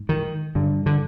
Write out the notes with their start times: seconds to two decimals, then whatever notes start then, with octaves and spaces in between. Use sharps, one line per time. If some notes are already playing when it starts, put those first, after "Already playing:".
Already playing: G#2
0.09 D#3
0.55 G2 D3
0.86 D3